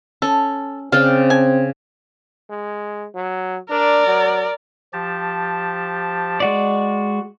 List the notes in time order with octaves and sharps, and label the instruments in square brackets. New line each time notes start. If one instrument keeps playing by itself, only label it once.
[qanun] C#4 [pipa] A4
[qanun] C#3 D5 G5 [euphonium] C4 [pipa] F5
[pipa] G#5
[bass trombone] G#3
F#3
[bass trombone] D4 [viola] A#4 D5
[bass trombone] F#3
[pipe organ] F3 G4 A5
[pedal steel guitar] G#3 F#4 D5